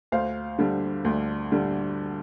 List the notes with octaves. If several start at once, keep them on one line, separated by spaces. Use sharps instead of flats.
D2 C5 F5
D3 G3
D2
D3 G3